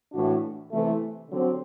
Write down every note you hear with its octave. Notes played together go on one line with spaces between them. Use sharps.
A2 E3 A3 D4 F#4
C3 E3 A3
D3 F#3 C4 G4